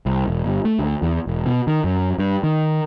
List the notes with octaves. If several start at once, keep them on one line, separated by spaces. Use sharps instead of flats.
C2
E1
G1
A3
D2
E2
E1
B2
D#3
F#2
G2
D#3